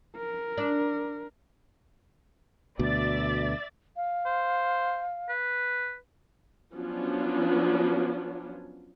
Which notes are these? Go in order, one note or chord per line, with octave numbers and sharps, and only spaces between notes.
A#4
D4
D2 B2 D5 E5 A6
F5
C5
B4
F3 F#3 B3 C#4 D4 F4